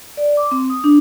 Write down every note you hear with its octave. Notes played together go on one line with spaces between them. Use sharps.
D5
D6
C4
D#6
D4